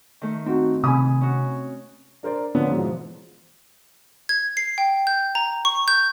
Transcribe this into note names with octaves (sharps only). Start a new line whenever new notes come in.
D#3 A3
C4 D#4 F#4
C3 G#5 B5 D#6
C#4 F#4
D4 A#4 C5 D5
D3 F3 B3 C#4 D4
G#2 B2 E3 F3
G#6
C7
G5
G6
A#5
C#6
G6